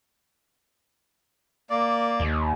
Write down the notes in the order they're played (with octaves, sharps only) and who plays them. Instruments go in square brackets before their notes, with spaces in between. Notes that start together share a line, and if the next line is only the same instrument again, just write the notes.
[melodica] A#3 D5
[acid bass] D#2